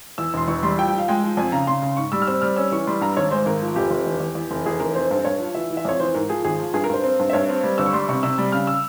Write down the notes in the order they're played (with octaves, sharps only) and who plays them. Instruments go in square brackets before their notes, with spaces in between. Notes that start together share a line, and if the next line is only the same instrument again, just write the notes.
[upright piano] E2 E6
E1 C6
E2 C#6
G3 C6
F3 G5
G5
F3
F5
G#3 G5
F3
F2 G#5
C#3 A#5
C#3 C6
C#3
G#2 C#6
G3 E6
F6
C4 E6
G3 F6
C#4 E6
E3 C#6
G3 C6
G2 A#5
G#1 C#5
G#3 C5
G#1 A#4
F3
F1 G4
F1
E2
E2
E2
F1
E2 G#4
F1 A#4
C4 C5
G2
G2 C#5
F3
E3 E5
E3
E5
F2 C#5
E3 C5
G#2 A#4
F3 G#4
G#1 G#4
F3
G2 G#4
A#4
G2 C5
C4
G2
E5
G2 C#5
C4
G3
G1 E6
C#6
G3 C6
C3 C#6
C3 E6
G3
C#3 F6
E6